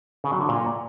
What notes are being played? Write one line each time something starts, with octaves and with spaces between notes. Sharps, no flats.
C#3
F#3
D3
A#2